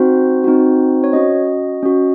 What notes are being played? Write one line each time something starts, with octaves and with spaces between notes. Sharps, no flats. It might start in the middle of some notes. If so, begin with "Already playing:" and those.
Already playing: C4 D#4 F#4 C5
C4 D#4 F#4
C#5
C#4 F#4 D#5
C#4 F#4